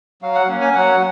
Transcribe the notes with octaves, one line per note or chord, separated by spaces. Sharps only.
F#3 F5
F#5
A#3 C#4
G#5
F#3 F#5